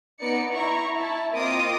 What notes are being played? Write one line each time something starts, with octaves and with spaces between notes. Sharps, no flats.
B3 D#4 D5 C#7
E4 A#5 C#6
E4 A5
A#3 C4 F4 D#5 D6 D#6